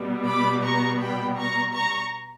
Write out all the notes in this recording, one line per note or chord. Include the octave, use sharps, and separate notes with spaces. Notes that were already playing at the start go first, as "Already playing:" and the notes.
Already playing: B2 G3 B3
B5 D6
A#5 C#6
G5 B5
A#5 C#6
A#5 C#6